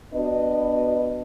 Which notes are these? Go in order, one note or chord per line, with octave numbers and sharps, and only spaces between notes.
B3 D4 F#4 B4 D#5